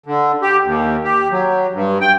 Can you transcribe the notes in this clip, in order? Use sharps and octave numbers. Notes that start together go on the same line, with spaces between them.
D3
G4
D#2
G4
F#3
G2
G5